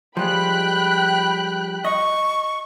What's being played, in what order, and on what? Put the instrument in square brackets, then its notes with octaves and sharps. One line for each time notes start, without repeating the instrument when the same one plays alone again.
[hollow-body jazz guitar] F3 G3 G#3 [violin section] G5 B5 F#6
[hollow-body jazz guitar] D#5 [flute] C#6